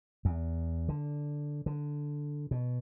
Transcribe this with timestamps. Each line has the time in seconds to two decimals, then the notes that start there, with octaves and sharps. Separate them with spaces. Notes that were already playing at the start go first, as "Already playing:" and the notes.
0.25 E2
0.89 D3
1.66 D3
2.51 B2